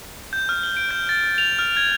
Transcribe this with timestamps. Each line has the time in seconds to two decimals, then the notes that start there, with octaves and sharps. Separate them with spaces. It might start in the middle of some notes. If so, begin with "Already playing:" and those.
0.33 G6
0.49 F6
0.64 G7
0.77 D7
0.91 G6
1.09 A6
1.38 F7
1.59 F6
1.77 G#6